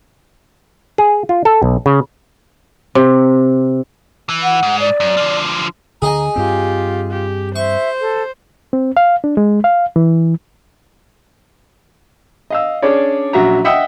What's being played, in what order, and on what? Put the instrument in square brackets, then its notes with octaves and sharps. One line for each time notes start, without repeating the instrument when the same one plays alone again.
[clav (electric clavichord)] G#4
F4
A4
B1
C#3
[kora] C3
[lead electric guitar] E3
[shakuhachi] F#5
[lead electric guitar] G#2
[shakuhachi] D5
[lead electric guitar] F#2
D3 F3
[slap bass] D2 D3 [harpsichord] G#4 D#5 G#5 [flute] A#5
[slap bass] G2 C4 [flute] F4 [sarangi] G4
[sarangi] G4
[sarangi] C5 [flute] E5 [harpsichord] C#6
[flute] A4
[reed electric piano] C4
F5
D4
G#3
F5
E3
[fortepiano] D#5 F5 E6
C#4 D4 G#4 C#5 D5
A#1 F#3 C#4 F#4 E5 A#5
D#5 E5 F#5 G5 D#6 E6